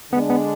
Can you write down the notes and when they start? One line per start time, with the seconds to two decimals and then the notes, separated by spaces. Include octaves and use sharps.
0.12 D3 G#3 B3 D4
0.30 B3